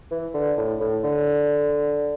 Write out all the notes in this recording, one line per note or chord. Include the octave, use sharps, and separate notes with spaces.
E3
D3
A2
A2
D3